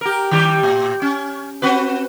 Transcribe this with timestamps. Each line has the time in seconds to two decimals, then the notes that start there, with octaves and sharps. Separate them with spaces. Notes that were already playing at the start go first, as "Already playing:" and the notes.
0.01 G4 A#4
0.31 D#3 G3 G4
0.63 A2
1.02 C#4
1.62 C4 F#4 B4